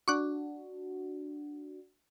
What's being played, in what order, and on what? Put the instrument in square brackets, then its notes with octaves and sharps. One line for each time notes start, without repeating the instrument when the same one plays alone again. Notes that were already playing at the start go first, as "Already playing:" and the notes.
[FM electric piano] D4 F#4 [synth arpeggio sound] C#6 D6 F#6